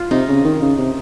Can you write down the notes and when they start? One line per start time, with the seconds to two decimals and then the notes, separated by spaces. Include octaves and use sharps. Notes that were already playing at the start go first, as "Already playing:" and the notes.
Already playing: F4
0.11 C3 D#4
0.28 C#3
0.45 D#3
0.62 C#3
0.79 C3